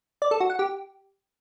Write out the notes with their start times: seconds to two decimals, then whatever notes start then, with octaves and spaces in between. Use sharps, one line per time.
0.22 D5
0.31 A4
0.40 F#4
0.50 F#5
0.59 G4